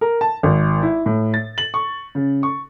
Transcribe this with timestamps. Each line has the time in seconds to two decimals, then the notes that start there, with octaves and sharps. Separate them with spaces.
0.01 A#4
0.21 A5
0.43 G#1
0.83 E4
1.06 A2
1.34 A6
1.58 F#7
1.74 C#6
2.15 C#3
2.43 C#6